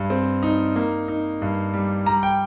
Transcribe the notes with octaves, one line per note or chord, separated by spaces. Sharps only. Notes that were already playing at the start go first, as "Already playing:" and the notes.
Already playing: G2
C4
D#4
A#3
D#4
G2
G3
G3 A#5
G5